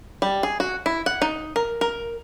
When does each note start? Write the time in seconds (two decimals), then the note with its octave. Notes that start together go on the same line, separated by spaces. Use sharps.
0.22 G3
0.43 G#4
0.60 F#4
0.86 E4
1.06 F#5
1.22 D#4
1.56 A#4
1.81 A#4